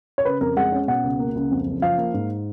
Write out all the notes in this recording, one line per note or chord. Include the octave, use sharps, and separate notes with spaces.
C#5
C#3 B4
F2 A#4
G#3 F#5
C#4
B2 F#5
C#2
A#3
C#2
F2
F#1
F3 F5
A#3
G#2